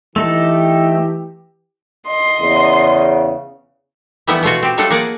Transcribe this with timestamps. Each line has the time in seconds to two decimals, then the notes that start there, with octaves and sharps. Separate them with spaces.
0.16 E3 A3 D#4 G4 A4
2.07 D#5 C6
2.40 E2 C#3
4.27 E3 F3 G3 A3 B3 E4
4.43 B2 A3 F4 F#4
4.63 C4 G4
4.77 F#3 G3 A3 F4 A4 F#5
4.90 A#3 G#4 D5 F#5